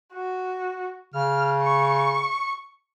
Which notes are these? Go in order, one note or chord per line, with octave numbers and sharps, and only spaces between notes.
F#4
C#3 F6
C#6